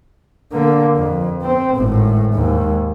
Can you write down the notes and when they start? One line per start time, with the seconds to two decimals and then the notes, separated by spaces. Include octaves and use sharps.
0.52 D3 A#3
0.96 F2
1.42 C4
1.76 G#1 A2
2.33 D#2 G#2